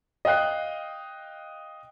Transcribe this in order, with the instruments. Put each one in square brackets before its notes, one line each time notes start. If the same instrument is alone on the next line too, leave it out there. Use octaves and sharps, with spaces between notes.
[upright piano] D#5 F5 G5 F#6 C7